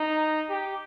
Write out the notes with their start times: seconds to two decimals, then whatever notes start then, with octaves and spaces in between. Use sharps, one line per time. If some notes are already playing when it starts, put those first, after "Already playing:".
Already playing: D#4
0.49 G4